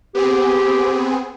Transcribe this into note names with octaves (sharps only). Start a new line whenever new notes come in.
B3 C4 G4 G#4